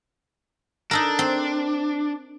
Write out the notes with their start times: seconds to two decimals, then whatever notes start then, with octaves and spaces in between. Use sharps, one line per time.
0.91 D4 D#4 A4 A#4
1.19 C4